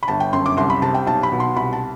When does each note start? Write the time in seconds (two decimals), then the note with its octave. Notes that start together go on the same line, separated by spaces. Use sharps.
0.03 B5
0.08 G1 A5
0.20 G5
0.32 F#2 C6
0.46 D6
0.57 C2 C6
0.70 B5
0.82 C3 A5
0.94 G5
1.07 B1 A5
1.23 B5
1.32 B2
1.40 C6
1.56 C2 B5
1.73 A5